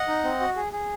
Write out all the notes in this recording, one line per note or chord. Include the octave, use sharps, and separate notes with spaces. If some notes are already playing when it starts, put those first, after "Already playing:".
Already playing: D#5 F#5
D#4
C4
F#4
G#4
G#4